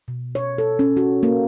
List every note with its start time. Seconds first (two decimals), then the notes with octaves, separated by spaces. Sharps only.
0.08 B2
0.35 C#5
0.58 A4
0.79 C#4
0.97 F#4
1.23 A#3